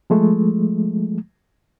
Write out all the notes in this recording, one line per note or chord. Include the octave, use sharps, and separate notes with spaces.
F3 G#3 A3